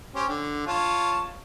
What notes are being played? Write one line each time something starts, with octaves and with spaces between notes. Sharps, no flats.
C#4 G4 C5
D3
F4 C#5 A5